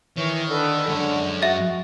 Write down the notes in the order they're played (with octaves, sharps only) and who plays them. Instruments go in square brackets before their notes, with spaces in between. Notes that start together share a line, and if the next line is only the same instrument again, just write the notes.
[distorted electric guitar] D#3 [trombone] E3 [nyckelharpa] C#5
[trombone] D3 [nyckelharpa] A4 B4
[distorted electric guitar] F#2 C#5 [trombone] D3 [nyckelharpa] G#3
[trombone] F#4 [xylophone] E5 A6